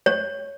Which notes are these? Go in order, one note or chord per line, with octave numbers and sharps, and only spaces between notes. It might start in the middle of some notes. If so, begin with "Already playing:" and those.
C#5